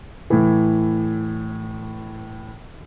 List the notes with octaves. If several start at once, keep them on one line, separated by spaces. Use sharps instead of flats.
A2 E3